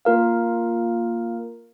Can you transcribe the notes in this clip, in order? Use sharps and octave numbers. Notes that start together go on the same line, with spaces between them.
A#3 F4 A#4 F5